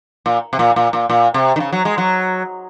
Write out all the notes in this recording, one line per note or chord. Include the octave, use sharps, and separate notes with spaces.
A#2
C3
A#2
A#2
A#2
A#2
C3
D#3
C#3
F#3
G#3
F#3